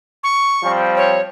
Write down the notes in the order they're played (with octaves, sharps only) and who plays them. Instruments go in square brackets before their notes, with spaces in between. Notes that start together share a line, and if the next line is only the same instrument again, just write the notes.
[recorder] C#6
[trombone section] F3 G3 C4
[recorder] C#5